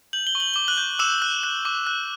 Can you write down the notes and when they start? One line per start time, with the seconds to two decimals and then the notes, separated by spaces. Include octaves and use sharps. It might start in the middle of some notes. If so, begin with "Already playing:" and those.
0.13 G6 F#7
0.27 G7
0.35 C#6
0.40 F#7
0.54 D6 G7
0.68 F#6 F#7
0.78 G6
0.99 D6 E6 E7
1.22 F#6
1.43 F#6
1.65 D6
1.87 F#6